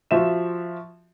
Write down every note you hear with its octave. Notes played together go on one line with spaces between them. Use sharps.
F3 F4 F#4 E5 E7